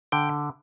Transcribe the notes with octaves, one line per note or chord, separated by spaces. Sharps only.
D3 G5